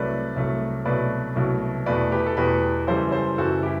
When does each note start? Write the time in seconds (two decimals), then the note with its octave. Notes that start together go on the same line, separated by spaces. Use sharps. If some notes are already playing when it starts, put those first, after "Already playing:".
Already playing: C2 C3 F#3 A3 B4 D5
0.36 C2 C3 F#3 A3
0.85 C2 B2 F#3 A3 B4 D5
1.36 C2 B2 F#3 A3
1.86 E2 B2 A3 B4 D5
2.12 G4 B4
2.26 A4
2.37 E2 B2 A3 G4 B4
2.87 F#1 F#2 E3 G3 A4 C5
3.12 A4 C5
3.38 F#1 F#2 E3 G3 F#4 A4
3.63 E4 G4